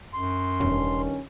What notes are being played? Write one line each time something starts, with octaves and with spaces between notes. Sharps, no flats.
F#2 C6
E1 G2 D#3 C#4